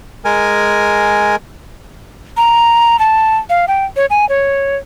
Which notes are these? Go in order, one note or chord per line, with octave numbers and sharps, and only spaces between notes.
G#3 A#4 G#5
A#5
A5
F5
G5
C#5
G#5
C#5